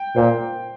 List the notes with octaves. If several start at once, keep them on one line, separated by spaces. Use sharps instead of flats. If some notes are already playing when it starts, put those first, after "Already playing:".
Already playing: G5
A#2 C5